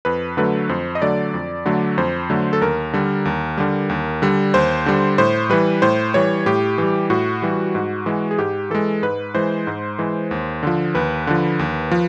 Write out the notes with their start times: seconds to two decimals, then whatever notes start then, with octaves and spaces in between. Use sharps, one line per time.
0.05 F2 B4
0.37 D3 F#3 A3 B4
0.69 F2 C5
0.95 D#5
1.02 D3 F#3 A3 D5
1.34 F2
1.66 D3 F#3 A3
1.98 F2 C5
2.30 D3 F#3 A3
2.53 A4
2.61 D#2 A#4
2.93 D3 G3
3.25 D#2
3.57 D3 G3
3.90 D#2
4.22 D3 G3
4.54 D#2 C5
4.86 D3 G3
5.18 A2 C5
5.50 E3 G3 B4
5.82 A2 C5
6.14 E3 G3 C#5
6.46 A2 G4
6.78 E3
6.83 G3
7.10 A2 F#4
7.42 E3 G3
7.75 G#2
8.06 E3 G#3
8.31 G#4
8.38 G#2 G4
8.70 E3 G#3 A4
9.03 G#2 B4
9.35 E3 G#3 C5
9.67 G#2
9.99 E3 G#3
10.31 D#2
10.63 D3 F3
10.95 D#2 B4
11.27 D3 F3
11.59 D#2
11.92 F3